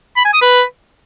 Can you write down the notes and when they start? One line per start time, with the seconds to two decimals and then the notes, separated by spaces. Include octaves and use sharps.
0.17 B5
0.25 G#5
0.33 D#6
0.42 B4